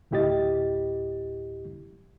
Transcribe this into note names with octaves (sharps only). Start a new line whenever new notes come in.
D2 A2 E4 G4 D#5 A6